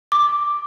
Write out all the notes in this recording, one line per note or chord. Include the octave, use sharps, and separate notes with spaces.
D6